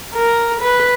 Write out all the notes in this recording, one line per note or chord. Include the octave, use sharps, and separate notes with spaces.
A#4
B4